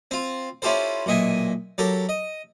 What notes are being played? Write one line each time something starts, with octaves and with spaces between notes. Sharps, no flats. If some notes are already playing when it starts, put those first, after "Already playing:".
C4 F4
C#4 E4 F4 G4 A4 C5
B1 A#2 D#5 E5 G#5
F#3 G4 A4 A#4
D#5